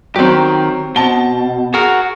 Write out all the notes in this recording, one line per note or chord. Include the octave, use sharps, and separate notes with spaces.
D#3 F#3 C4 G4
B2 C4 A5 G7
F#4 G#4 A#4